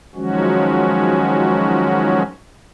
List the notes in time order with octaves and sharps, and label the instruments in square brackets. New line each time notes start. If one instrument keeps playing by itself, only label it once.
[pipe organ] D#3 F3 F#3 G#3 C#4 F#4